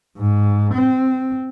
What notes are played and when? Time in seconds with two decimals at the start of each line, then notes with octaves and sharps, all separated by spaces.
0.18 G#2
0.74 C4